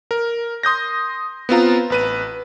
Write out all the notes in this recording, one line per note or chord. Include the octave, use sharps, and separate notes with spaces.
A#4
C6 D#6 G6 A#6
B3 C4 F4 A#5
A1 B4 D#7